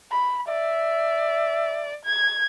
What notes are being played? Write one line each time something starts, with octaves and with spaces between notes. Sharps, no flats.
B5
D5 E5
G#6